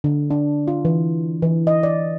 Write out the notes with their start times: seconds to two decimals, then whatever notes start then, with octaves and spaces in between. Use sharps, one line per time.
0.04 D3
0.30 D4
0.68 F4
0.85 E3
1.42 E3
1.67 D#5
1.83 D5